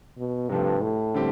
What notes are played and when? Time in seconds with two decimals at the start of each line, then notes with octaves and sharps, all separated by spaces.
0.18 B2
0.49 G2 C3 F3 A3
0.82 A2
1.15 D3 G3 C4 G4